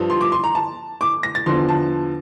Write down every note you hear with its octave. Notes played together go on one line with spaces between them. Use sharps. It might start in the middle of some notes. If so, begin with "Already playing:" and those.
Already playing: G2 F3
C6
D6
C6
A#5
A5
D6
A#6
A6
E2 D3 F3 C6
A5